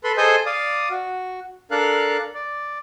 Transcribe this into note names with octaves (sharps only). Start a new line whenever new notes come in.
A4 B4 B5 C6
G#4 A4 C5 D#5 G#5 G6
D5 F5 D#6
F#4
D4 A4 A#4 F5 F#6
D5